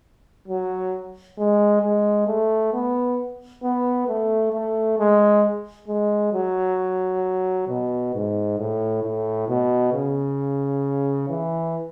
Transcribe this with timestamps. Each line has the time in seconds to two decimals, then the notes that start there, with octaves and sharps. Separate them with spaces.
0.48 F#3
1.38 G#3
1.82 G#3
2.27 A3
2.73 B3
3.63 B3
4.08 A3
4.53 A3
4.99 G#3
5.88 G#3
6.33 F#3
7.68 B2
8.14 G#2
8.59 A2
9.04 A2
9.49 B2
9.93 C#3
11.30 E3